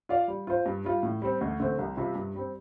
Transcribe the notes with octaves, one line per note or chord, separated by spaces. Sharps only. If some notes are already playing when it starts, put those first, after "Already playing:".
F4 D5 F5
G3
F4 C5
G2
G3 F4
A2
G3 C4
D2
D3 A3 C4
C2
C3 G3 F4
G2
G3 C4